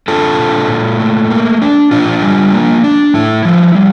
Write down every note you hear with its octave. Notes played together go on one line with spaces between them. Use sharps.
D4 F4 A4
A#2
A#2
A3
A#3
D4
A#2 D4 F4
G3
A#3
D4
A2 E4
F3
G3